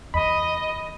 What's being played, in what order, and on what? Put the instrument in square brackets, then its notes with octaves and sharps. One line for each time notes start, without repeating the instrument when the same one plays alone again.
[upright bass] E2 [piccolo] D#5 [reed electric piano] B5